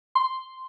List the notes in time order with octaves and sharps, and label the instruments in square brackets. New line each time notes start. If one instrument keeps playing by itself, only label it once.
[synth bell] C6